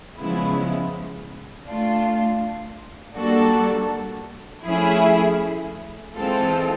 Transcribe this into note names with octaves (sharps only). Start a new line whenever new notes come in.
C#3 F3 G#3 B3 E4
A3 D4 F4
G3 A#3 D4 F#4 A4
F3 A3 C#4 E4 G#4
E3 G#3 C4 F4 A4